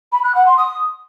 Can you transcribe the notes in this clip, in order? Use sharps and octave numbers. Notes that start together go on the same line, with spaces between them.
B5
F#6
F#5
C6
D#6